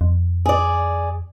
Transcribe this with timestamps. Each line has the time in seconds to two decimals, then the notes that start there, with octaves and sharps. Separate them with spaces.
0.01 F2
0.46 G#4 D5